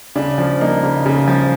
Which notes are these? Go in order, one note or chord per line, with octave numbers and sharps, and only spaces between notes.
C#3 D4
F3
A#3 D#4
C#3
C#3
F3